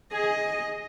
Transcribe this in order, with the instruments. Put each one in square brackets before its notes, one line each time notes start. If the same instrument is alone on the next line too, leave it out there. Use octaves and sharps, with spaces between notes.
[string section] G#4 [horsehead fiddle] D#5